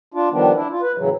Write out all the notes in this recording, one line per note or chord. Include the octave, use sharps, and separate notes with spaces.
D4 F4
D#3 F3 G3 B3 D4
D4 E4
F4
B4
A2 C#3 E3 F#3